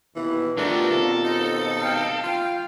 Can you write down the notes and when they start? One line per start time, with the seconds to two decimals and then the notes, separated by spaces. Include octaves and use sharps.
0.16 D#2 B2 E3 E4
0.58 B2 D3 G3 A3 D4 F4 A#4
0.91 D#2 B2 C4 A4
1.24 D#4
1.82 F5 G5
2.24 F4